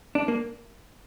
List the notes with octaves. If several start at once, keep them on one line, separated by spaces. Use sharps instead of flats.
D4
A#3